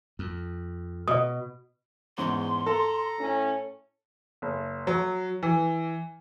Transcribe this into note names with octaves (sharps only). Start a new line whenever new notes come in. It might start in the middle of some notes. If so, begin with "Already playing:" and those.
F2
B2 D#5 D#6
E2 G#2 C#4 C6
A4 A5 A#5
A2 C#4
F#1
F#3
E3